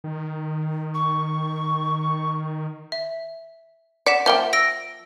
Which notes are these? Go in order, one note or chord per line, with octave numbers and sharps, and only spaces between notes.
D#3
C#6
E5
D5 F#5 B6 E7
F3 A#3 E5 G5 G7
E6 A#6 D7